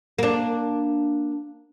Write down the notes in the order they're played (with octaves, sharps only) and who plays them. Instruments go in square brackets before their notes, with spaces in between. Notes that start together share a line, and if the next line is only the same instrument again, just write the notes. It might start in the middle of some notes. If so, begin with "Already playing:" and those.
[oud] A#3 D4